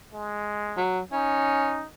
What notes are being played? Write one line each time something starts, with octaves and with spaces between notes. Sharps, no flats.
G#3
F#3
C#4 D#4